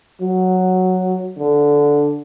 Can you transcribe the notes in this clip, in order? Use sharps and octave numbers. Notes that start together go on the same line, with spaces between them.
F#3
D3